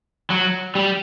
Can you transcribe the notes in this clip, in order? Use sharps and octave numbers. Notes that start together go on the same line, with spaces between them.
F#3
G3